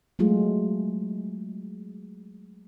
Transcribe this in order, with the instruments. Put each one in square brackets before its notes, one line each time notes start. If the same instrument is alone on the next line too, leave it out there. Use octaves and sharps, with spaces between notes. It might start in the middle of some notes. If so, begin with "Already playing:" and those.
[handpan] F#3 G#3 A3 F4 G#4